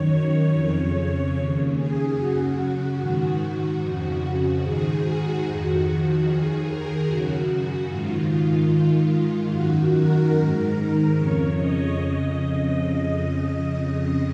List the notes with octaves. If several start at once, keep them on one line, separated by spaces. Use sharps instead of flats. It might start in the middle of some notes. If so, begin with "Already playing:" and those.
Already playing: F#2 D#3 C#5
C#5
F2 C#3 C#5
D#2 C#3
G#4
F#2 C#3 F#4
G#2 D#3
F#4
F2 C#3 F#4
G#2 D#3 G#4
F#4
F2 D#3 F#4
D#2 D#3 G#4
A#4
F#2 C#3 F#4
F#4
G#2 D#3 F4
F4
G#2 D#3
F#2 D#3 F#4
A#4
G#2 D#3
F2 C#3 C#5
D#5
F2 C#3